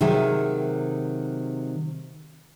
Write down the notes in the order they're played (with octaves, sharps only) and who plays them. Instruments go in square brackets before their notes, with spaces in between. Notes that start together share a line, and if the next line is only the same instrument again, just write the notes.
[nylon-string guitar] C3 D#3 F#3 G#4 E5